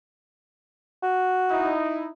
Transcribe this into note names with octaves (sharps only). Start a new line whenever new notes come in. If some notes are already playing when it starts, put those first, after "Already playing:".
F#4
D#4 E4